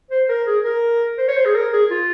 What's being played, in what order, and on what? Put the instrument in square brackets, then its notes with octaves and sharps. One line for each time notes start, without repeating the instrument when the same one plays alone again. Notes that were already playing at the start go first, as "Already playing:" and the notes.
[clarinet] C5
A#4
G#4
A#4
C5
C#5
C5
G#4
A#4
G#4
F4